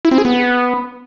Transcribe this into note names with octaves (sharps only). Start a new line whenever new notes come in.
E4
C4
G#4
B3